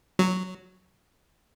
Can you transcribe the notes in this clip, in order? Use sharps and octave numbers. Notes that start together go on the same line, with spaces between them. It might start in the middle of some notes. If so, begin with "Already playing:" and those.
F#3